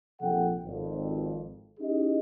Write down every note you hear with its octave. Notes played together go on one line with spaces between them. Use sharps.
A#1 C3 F3 A4 F#5 G5
G#1 F2
C#4 D#4 E4 G4 G#4 D#5